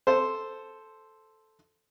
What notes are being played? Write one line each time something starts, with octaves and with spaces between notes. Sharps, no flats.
A4 C5